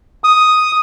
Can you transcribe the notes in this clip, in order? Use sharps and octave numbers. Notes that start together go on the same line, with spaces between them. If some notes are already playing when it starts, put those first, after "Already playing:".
D#6